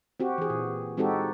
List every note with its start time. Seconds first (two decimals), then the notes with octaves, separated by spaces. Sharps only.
0.20 C4 F#4 G4
0.38 E3 G#4
0.50 A#2
0.97 G#3 C4 D#4 F#4 G4 A4